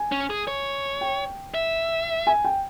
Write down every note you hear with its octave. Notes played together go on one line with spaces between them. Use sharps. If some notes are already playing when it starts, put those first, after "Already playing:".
Already playing: G#5
C#4
G#4
C#5
G5
E5
G#5
G5